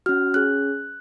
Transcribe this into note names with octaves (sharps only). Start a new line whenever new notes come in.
C#4 F#4 F6
C#4 G#4 F#6